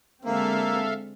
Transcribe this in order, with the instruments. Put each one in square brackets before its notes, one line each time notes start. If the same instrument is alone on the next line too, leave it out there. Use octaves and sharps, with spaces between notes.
[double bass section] D3 G#3 C4 [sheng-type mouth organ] A#3 [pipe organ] A4 E5 F5